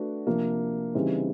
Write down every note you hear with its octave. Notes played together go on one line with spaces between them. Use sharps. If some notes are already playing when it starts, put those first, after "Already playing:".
Already playing: A3 D4 F#4 B4
C3 F3 A#3 D4
C#3 E3 G3 C4 D#4